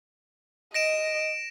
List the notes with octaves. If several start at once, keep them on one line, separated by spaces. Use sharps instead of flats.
D#5 A#6 D7 E7